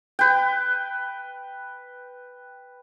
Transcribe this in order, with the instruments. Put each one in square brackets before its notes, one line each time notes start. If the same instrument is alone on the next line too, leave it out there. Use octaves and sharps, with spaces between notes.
[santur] B4 G5